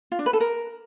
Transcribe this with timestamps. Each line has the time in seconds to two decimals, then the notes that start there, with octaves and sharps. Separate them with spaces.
0.12 F4
0.19 D4
0.26 B4
0.33 A4
0.41 A#4